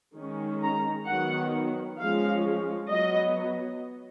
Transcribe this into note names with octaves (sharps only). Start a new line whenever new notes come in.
D#3 G#3 C#4
A#5
D#3 F#3 B3 F#5
F3 G#3 C#4 F5
F#3 B3 D#5